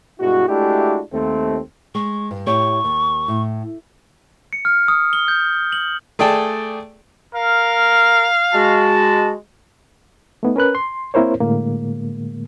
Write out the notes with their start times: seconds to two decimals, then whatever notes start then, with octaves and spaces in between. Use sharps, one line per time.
0.20 G2 B2 G#3 E4 F#4
0.49 G#3 A3 D4 E4 F#4 G4
1.13 D#2 A3 C4
1.95 G#3 C#6
2.31 G2
2.47 A2 G4 C#5 C#6
2.84 D#2
3.28 A2
4.53 C#7
4.65 F6
4.88 D#6
5.13 G7
5.28 G6
5.72 F#7
6.19 A3 G#4 D5 G5 A5
7.35 A#4 F5
8.54 G#3 F#4 A5
10.43 A3 B3 D#4
10.56 C#4 A#4 B4 F#6
10.75 C6
11.14 A#3 C4 E4 A#4 C5 C#5
11.40 A2 D3 G#3 A#3